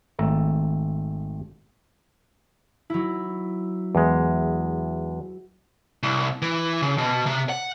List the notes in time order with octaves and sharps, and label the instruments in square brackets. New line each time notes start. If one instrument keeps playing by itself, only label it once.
[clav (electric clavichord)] G#1 A3 A4 A#5
[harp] F#3 E4
[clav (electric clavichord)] E2 G#3
[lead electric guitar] C2
E3
C#3
B2
C3
F#5